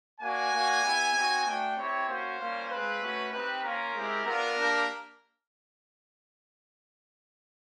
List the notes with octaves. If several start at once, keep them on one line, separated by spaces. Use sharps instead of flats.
A#3 D4 F#4 G#5
A#3 D4 F#4
B3 E4 G4
C4 D#4 F#4
A3 D4 F#4 G5
C4 E4 G4 C#5
A#3 C#4 F#4 C5
G3 A#3 C#4 F4
G#3 C4 F4 B4
A3 C#4 F#4
C4 D#4 G4 B4
A#3 C#4 F4 A#4
G#3 C4 E4 G4
B3 D4 F4 A#4
A#3 D4 G4